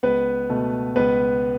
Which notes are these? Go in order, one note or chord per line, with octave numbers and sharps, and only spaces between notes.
C#2 B3 B4
B2 A3
C#2 B3 B4